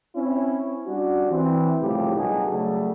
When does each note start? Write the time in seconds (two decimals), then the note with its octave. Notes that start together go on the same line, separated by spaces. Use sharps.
0.15 C4 C#4 E4
0.86 G3 C#4 D4 F#4
1.30 E3 C4
1.81 C2 A2 C#3 F3 G4
2.16 B1 G2 D#4 F#4 G#4 A4
2.50 C#3 F#3 G3 A3